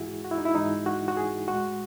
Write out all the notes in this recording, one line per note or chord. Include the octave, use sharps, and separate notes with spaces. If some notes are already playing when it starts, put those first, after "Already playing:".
Already playing: G#2 E3 G#3 E4 F#4 G#4
F#4
E4
D#4
E4
G#2 E3 G#3 D#4
F#4
F#4
G#4
A2 G#3 F#4